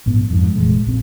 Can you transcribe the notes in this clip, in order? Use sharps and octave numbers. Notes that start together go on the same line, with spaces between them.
A#1 G#2 B3
F2 G#2
F1 A#2 E3 G#3
A#1 C4